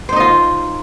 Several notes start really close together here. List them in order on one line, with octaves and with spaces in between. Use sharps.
C5 D#4 D#5 F4